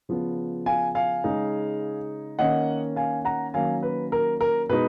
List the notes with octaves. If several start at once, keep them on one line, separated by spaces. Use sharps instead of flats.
C#3 F3 B3
F5 G#5
F5 G#5
C#3 G#3 D#4
D#3 A#3 C#4 D#5 F#5
F5 G#5
F#5 A#5
D#3 F#3 A#3 C#4 F5 G#5
B4
A#4
A#4
B2 G#3 D#4 B4